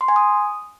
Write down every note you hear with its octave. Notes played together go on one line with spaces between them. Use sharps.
C6
G#5
D#6